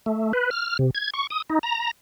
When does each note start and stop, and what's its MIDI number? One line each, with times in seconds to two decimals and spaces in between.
0.06 0.33 57
0.33 0.50 71
0.51 0.77 89
0.79 0.90 48
0.95 1.10 92
1.14 1.27 85
1.30 1.42 87
1.50 1.59 63
1.63 1.91 82